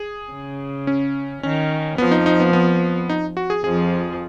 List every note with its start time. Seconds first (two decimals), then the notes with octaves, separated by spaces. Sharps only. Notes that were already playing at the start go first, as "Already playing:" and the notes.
Already playing: G#4
0.33 C#3
0.87 C#4
1.43 D#3 C#4
1.98 F2 F3 B3
2.11 D#4
2.26 D#4
2.40 B3
2.53 B3
3.09 D#4
3.37 F#4
3.50 G#4
3.64 F2 F3 G#4